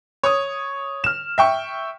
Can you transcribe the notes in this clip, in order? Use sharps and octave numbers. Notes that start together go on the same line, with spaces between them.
C#5 C#6 D#6
F6 E7
E5 G5 C#6